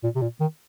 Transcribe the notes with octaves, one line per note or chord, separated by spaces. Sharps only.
A#2
C3
A#2
D#3